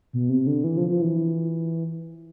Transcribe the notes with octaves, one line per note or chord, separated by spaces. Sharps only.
B2
C3
D3
E3
F3
F3
E3